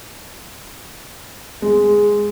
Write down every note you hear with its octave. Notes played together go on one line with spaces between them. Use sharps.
G#3